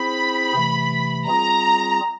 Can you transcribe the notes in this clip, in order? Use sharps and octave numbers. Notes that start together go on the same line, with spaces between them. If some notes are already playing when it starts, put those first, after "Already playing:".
Already playing: C4 E4 G#4 C5 B5
C3 E3 A3
G3 C4 F4 G#4 A#5